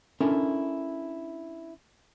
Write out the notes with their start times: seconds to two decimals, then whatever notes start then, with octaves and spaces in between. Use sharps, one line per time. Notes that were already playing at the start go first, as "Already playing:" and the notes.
0.21 C#4 D4 E4 A4 A#4